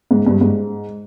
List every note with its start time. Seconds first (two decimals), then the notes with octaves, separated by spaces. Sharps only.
0.11 G#2
0.26 G2
0.41 G#2